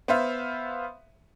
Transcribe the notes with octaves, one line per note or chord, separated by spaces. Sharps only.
B3 C5 E5 F5